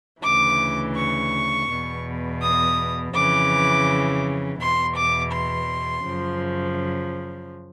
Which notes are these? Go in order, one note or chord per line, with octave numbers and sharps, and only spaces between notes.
D2 C#3 E3 D6
C#6
E2 B2
D#6
F2 C#3 E3 D6
E2 B2 C6
D6
C6
F#2 C#3 F3